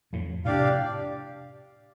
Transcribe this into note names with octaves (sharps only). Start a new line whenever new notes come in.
F2 A2
A2 C3 D4 G4 D5 F5